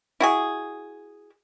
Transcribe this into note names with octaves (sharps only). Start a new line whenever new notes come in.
E4 F#4 G#4